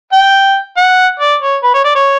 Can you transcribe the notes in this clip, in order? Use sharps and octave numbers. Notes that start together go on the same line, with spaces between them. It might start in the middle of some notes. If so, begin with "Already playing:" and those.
G5
F#5
D5
C#5
B4
C#5
D5
C#5